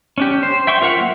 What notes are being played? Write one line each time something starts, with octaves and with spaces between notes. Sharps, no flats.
C#4 D4 G4
C5
E5 G5 C6 C#6
F4 A#4 E5 F#5
F#3 A#3